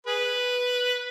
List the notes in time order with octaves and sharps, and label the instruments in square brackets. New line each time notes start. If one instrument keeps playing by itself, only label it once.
[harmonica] G#4 B4